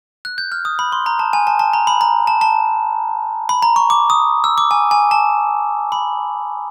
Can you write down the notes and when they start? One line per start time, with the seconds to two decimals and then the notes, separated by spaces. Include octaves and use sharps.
0.25 F#6
0.38 G6
0.52 F6
0.65 D#6
0.79 B5
0.92 C6
1.06 A#5
1.19 A5
1.33 G#5
1.47 A5
1.59 A5
1.73 A#5
1.87 B5
2.01 A#5
2.27 A5
2.41 A5
3.49 B5
3.63 A#5
3.76 C#6
3.90 D6
4.10 D#6
4.44 E6
4.58 D6
4.71 G#5
4.91 G#5
5.11 A5
5.92 B5